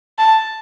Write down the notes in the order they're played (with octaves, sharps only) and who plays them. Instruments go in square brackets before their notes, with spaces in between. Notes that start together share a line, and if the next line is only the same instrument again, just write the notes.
[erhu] A5